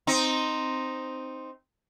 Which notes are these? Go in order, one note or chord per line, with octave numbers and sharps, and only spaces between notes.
C4 D#4